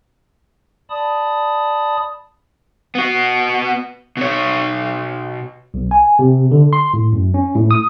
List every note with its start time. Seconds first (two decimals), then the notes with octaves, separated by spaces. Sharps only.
0.90 D5 A5 B5 D#6
2.95 B3 F#4
4.17 B2 C#5
5.74 B1
5.91 G#5
6.19 C3
6.51 D3
6.73 C6
6.94 A2
7.12 F#2
7.34 C#4
7.55 A2
7.71 D#6